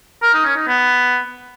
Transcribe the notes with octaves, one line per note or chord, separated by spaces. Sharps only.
A#4
D#4
C#4
D#4
B3